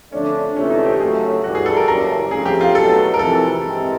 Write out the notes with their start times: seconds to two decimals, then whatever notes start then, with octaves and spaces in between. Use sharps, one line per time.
0.12 F2 D3 F3 A3 C#4 D4
0.56 C#2 C3 E3 A3 C#4
0.70 D#4
0.86 G4
1.00 F#2 C#3 F#3 A3 G#4
1.44 G2 E3 G3 F#4
1.55 G#4
1.66 A4
1.77 A#4
1.88 F#1 F#2 C#3 E3 G3 A#4
2.31 F2 C#3 F3 A3 G#4
2.46 G4
2.61 F4
2.75 B1 B2 F#3 A3 A4
3.14 A#4
3.19 F2 C3 E3 A4
3.63 G2 E3 G#3 C4